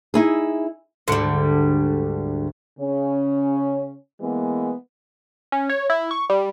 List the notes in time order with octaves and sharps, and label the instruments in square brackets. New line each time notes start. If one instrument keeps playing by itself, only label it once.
[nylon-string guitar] D#4 E4 G#4
[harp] D2 G#2 [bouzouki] D3 G3
[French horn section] C#3 C#4
E3 G#3 A#3 B3
[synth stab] C#4
C#5
E4
C#6
G3